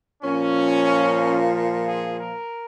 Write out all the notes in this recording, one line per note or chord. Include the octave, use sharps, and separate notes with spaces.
A#2 F3 C#4
G#4
A#4